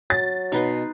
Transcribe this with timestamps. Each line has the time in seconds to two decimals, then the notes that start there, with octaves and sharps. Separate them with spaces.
0.10 F#3 A6
0.52 B2 D#4 B4 C6